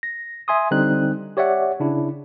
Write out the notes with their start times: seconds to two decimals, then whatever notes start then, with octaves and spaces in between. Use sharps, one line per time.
0.03 A#6
0.48 E5 G#5 C6 D#6
0.71 D3 G3 C4 D#4 F#6
1.37 G4 C#5 D5 E5 F#5
1.80 C#3 D4 E4